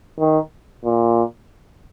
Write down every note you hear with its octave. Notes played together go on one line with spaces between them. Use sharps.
D#3
A#2